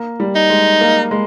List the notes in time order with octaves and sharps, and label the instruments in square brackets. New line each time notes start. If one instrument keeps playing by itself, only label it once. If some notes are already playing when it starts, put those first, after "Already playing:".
Already playing: [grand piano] A#3
G3
[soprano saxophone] D#4
[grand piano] G#3
A#3
G#3